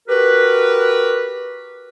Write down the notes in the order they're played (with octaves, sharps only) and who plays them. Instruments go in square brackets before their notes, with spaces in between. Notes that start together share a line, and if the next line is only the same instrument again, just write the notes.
[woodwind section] F#4 G4 A#4 B4